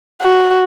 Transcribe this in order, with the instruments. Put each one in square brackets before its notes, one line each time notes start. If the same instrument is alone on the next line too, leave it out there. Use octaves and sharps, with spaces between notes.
[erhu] F#4